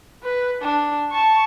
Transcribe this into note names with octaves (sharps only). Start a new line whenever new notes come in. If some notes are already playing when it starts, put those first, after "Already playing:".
B4
D4
A5 C#6